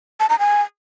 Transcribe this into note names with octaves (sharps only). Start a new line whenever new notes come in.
A5
A#5
G#5